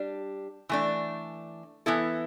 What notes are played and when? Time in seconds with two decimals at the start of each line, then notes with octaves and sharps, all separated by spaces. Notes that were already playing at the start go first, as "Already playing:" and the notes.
Already playing: G3 D4 G4
0.69 E3 A3 D4
1.86 E3 B3 E4 A4